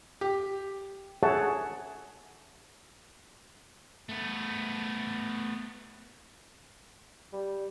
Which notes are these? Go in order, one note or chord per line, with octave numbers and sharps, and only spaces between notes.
G4
G#4 A4 C#5 E5 F#5 A5
A3 B3
G3